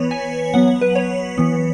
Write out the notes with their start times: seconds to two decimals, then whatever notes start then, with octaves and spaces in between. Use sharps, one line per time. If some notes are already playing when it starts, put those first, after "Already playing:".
Already playing: E3 B3 B4 C#5
0.11 G#5
0.54 F#3 B3 F#5
0.81 B4
0.95 C#5
1.38 E3 B3